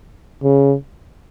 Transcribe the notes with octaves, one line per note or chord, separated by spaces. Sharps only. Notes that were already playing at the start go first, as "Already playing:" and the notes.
C#3